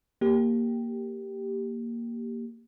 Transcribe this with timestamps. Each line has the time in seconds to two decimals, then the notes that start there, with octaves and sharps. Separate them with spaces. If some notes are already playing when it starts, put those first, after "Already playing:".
0.21 A#3 G4